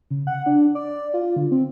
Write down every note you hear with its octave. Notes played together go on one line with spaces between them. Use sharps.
C#3
F#5
D4
D5
F4
D3
C4